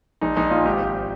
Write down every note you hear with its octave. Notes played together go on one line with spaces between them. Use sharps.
A#1 D#4
A#1 D#4
A#2 F4
G#1 G4
G#1